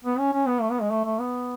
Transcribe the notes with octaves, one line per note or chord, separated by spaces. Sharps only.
B3
C#4
C#4
B3
A3
B3
G#3
A3
A3
B3